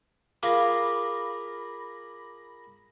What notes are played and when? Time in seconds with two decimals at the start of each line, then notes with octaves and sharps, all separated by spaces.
0.43 F4 G#4 A#4 F5 B5 D6 A#6